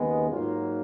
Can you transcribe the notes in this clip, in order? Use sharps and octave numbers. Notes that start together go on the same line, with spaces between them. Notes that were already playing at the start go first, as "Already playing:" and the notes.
Already playing: D#2 C#3 G#3 B3
G#2 F#3 A#3 F4